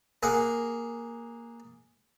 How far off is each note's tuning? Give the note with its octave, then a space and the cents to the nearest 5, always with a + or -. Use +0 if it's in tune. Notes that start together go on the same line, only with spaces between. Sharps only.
A#3 +0 G#4 +0 F#5 -5